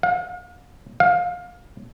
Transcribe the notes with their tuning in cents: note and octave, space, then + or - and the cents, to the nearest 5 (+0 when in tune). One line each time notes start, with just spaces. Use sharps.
F5 +45
F5 +25